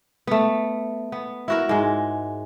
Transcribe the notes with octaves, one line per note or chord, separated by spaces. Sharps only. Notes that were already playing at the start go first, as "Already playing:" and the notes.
A3 B3
B3
E4 F#4 A#4
G#2 G#3